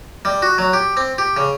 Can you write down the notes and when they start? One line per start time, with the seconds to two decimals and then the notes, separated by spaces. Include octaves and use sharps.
0.25 G3
0.42 F#4
0.58 F#3
0.73 G4
0.97 C4
1.18 G4
1.37 C#3